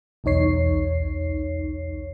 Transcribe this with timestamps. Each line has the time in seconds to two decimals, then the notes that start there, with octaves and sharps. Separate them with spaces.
0.24 B1 E2 D#4 C#5 C7